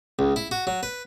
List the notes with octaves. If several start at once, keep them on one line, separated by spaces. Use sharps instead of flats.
C#2
E4
F#4
F#3
B4